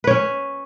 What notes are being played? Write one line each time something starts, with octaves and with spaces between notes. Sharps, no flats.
C#4 B4 C#5